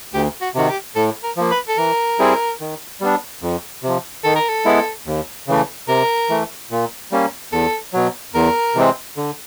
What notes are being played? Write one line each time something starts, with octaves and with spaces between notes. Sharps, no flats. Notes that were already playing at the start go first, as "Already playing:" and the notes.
D2 G4
F#4
C3 D#3 F#4
G4
A2 A4
A#4
F3 A#3
B4
A4
E3 A#4
G3 C4 E4 G#4
D#3
G3 B3 D4
F2
C3 F3
D#3 A4
A#4
A4
G#3 B3 E4
D#2
C#3 E3 A3
C3 A#4
E3 A3
A#2
G3 A#3 C#4
E2 A4
B2 F#3
E2 A#4
C3 E3 G#3 C4
D3